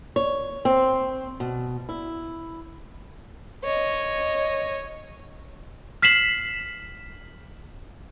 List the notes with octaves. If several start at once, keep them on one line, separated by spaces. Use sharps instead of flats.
C#5
C4
B2
E4
C#5 D#5
F6 B6 C7 E7 F#7